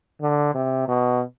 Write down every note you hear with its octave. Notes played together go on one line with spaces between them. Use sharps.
D3
C3
B2